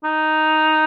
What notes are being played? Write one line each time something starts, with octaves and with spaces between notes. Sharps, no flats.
D#4